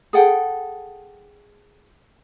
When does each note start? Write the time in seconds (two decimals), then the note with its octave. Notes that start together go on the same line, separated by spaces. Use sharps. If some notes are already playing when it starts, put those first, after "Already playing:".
0.13 G#4 A4 F#5 G5